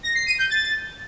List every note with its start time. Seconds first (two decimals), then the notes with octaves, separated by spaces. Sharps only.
0.03 A#6
0.15 C7
0.26 D#7
0.38 G6
0.50 A6